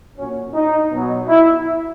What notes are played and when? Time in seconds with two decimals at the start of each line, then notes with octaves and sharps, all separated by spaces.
0.17 A#2 F#3 C#4
0.54 D#4
0.91 B2 F#3
1.28 E4